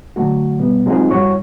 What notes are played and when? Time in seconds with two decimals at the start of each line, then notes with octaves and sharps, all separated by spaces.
0.16 D3 F#3 A3 F#4
0.59 B2 G3 B3
0.86 F#3 G#3 C4 D#4 F4 G#4
1.11 G2 G3 E4 F#4 C#5 C#6